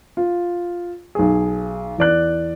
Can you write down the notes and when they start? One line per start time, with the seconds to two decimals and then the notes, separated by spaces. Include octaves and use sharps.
0.17 F4
1.15 B1 G#4
1.98 E2 D5 F#6